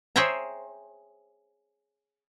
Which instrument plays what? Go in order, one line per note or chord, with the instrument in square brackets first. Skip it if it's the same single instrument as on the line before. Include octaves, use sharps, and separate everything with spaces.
[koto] G#4 C5 C#5 E5 G5 A#5